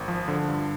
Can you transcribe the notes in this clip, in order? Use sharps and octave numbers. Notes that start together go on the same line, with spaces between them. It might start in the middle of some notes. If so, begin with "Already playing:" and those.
Already playing: G#1
F3
D3
G2